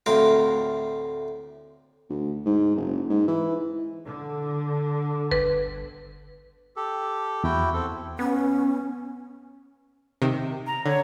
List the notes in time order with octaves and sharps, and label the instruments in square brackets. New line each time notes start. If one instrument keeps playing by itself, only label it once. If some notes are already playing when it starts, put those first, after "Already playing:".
[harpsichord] D2 A2 C4 A#4 F5
[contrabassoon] D2
G#2
F#1
G#2
E3
[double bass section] D3
[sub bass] G1 [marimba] B4
[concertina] G4 A4
[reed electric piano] E2 [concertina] E4 F#4 G5
[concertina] C4 A4
[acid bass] B3 [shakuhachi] C#4
[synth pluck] C3 D#3
[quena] A#5
[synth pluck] D3 [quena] C#5